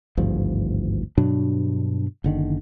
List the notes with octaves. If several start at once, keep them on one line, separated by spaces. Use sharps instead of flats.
G#1 D2 G2 F3
G2 B2 F#3 D4
F#1 D3 D#3